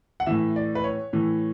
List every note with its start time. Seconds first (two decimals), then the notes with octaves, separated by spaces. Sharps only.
0.20 F#5
0.26 A2 E3 E5
0.56 D5
0.75 B4
0.84 C#5
1.13 A2 E3